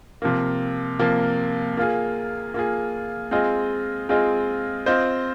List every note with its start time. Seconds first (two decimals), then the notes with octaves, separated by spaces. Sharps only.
0.22 C3 F3 A#3
0.99 C3 F3 A#3
1.77 A#3 F4 G#4
2.54 A#3 F4 G#4
3.31 G#3 C4 F4 G#4 D#5
4.09 G#3 C4 F4 G#4 D#5
4.86 C4 F4 C5 D#5